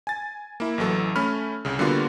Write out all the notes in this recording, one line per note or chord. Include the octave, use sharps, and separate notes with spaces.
G#5 A6
A#3 E4
A1 E3 F#3 A4
A3 C#4 B5 F6
C2 C#3
D3 G3 A#3 B3 F4 F#4